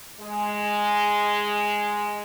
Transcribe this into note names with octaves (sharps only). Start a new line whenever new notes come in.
G#3